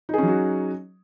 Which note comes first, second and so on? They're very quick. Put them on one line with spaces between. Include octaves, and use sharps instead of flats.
D#4 G#4 C#4 F#3 F#4